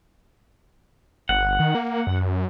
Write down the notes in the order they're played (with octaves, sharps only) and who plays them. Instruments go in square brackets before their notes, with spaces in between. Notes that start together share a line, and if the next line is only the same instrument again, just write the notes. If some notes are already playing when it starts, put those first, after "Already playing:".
[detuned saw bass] G1 [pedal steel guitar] F#5
[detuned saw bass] D#3
A#3
F#2